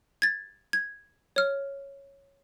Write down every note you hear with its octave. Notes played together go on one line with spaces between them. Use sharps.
G#6 A6
G#6
C#5 F6